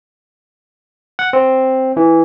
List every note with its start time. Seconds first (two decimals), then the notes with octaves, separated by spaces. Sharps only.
1.19 F#5
1.33 C4
1.97 E3